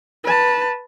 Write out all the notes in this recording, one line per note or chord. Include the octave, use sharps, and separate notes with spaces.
B4 A5